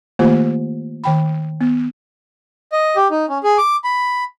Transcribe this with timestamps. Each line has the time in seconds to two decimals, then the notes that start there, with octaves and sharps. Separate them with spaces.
0.19 D#3 A3 A#3 F4 G4 C5
1.04 D#3 G5 B5
1.61 B3
2.72 D#5
2.96 G4
3.11 D#4
3.29 C#4
3.44 G#4
3.58 D6
3.84 B5